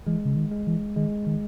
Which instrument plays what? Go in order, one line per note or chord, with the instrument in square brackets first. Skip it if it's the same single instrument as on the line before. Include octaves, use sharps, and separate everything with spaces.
[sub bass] E3 [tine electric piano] G#3
[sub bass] C#3
D#3
[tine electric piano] G#3
[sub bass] E3
[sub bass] D#3 [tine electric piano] G#3
[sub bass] D#3